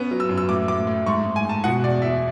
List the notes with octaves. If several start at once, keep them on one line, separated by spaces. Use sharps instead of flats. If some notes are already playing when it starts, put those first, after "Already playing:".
Already playing: B3 C#4
F#3
E6
F#2
E6
A2 D6
A2 D6
A2
G#2 C#6
G#2
G#5
G#2 A5
B2 F#5
E2 D5
E2 E5